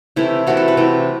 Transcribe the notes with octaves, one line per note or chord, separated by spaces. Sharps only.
C3 E3 A3 E4
C3 E3 A3 F#4
A4
B4
C3 E3 A3